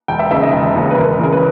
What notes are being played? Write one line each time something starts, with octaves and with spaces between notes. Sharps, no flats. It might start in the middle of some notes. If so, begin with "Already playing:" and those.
E1 G5
E5
D#2 C#3 E5
D#5
E1
D#2 C#3
B4
E1 A#4
E2 C#3 A#4
B4